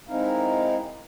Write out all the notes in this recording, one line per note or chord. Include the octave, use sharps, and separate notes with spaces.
G#3 C4 D#4 E4 A#4 F5